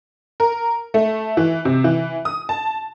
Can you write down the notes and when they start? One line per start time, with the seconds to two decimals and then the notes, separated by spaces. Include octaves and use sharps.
0.40 A#4
0.94 A3
1.37 E3
1.65 C3
1.84 E3
2.25 D#6
2.49 A5